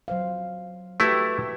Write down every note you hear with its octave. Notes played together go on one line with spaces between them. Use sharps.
F#3 C5 F5
A3 E4 F#4 G4 B4